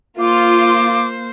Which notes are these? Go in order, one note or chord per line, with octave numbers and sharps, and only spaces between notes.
A#3 F4 C5 D6